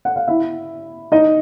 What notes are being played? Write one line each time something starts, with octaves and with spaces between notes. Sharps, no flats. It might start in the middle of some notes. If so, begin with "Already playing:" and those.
F#5
F5
E4 E5
D#4 D#5